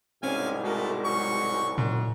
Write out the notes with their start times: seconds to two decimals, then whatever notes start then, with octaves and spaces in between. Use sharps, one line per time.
0.23 C2 G#2 B2 C4 C#4 F5 G#5
0.64 G#3 A3 F#4 A4 A#4
1.05 F#3 C#6
1.78 F#2 A#2